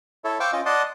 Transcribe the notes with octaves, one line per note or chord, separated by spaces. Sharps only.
E4 A4 C#5
C5 F5 G5 C#6 D6 E6
C#4 F4 D#5
D5 D#5 F#5 A5 C6 D#6